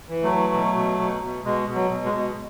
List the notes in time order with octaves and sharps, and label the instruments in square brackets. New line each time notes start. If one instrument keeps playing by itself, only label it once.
[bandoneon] E3
F#3 A3
E3
B2
B2
B2
B2
B2 G#3
B2
F#3
B2
G#3
B2